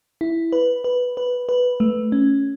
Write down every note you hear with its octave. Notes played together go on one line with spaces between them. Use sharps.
E4
B4
B4
B4
B4
A3
C#4